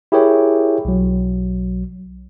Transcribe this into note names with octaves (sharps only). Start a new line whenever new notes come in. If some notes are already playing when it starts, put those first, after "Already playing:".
E4 G4 G#4 A#4 C#5 G5
B1 F#3